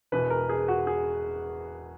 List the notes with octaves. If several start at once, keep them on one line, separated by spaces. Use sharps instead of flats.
E1 E2 B2 B4
A#4
G#4
F#4
G#4